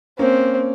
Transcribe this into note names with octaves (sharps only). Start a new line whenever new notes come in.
A#3 C4 C#4